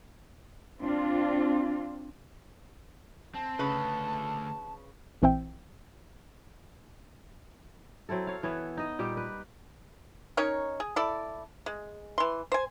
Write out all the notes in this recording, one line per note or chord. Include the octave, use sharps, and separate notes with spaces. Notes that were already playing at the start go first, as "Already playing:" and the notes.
C4 D4 F4
C4 A5
D2 C#3 A4 B4
A#1 E3 C4 E5 G5
F#3 C4 E4 A4
C#5 F5
E3 B3 C#5 E5
D#4 D#5
A#2 G3 G4
B4
C#4 D#4 A#4 C#5
G#4
E4 A4 D5
G#3
E3 C6
C5 G#5